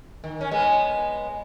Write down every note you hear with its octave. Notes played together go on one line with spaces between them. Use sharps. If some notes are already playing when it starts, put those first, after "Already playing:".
D#3
C#4
G#3 B3